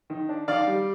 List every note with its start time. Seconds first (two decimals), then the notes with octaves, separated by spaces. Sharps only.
0.10 D#3
0.29 D4
0.48 D#3 D5 F5
0.67 G3